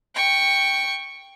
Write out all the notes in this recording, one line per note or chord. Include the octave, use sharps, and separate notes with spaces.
G5 C#6